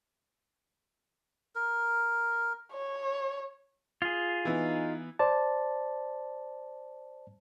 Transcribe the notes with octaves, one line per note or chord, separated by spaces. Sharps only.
A#4
C#5
F4 G#4
E3 B3 D#4
C5 D5 A5